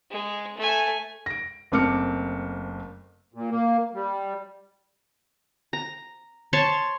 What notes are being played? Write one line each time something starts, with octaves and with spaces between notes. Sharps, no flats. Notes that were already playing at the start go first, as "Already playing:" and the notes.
G#3
A3 G#5
A#6 D7
F#1 A3 C4 D6 F6 C#7
A#2
A#3
G3
A#5
C#5 A5 C6 C#6